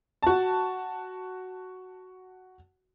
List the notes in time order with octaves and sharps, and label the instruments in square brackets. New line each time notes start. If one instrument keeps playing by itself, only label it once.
[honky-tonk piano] F#4 A5